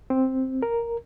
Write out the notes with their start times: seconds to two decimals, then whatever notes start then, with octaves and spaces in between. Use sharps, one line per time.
0.10 C4
0.62 A#4